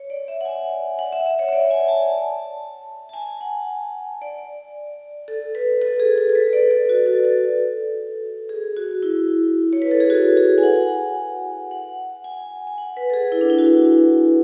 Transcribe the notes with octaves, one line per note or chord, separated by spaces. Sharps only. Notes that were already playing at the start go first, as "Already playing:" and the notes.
Already playing: C#5
D5
E5
F#5
G#5
F#5
E5
E5
C#5
E5
D5
G#5
A5
A5
G#5
F#5
D5
A4
B4
A4
G#4
A4
A4
B4
D5
A4
F#4
A4
A4
G#4
F#4
E4
C#5
B4
A4
G#4
F#4
G#4
G#5
F#5
F#5
G#5
G#5
F#5
B4
A4
G#4
E4
D4
E4
F#4